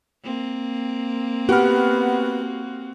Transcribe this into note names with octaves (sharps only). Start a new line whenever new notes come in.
A#3 C4
B3 F#4 G4 F6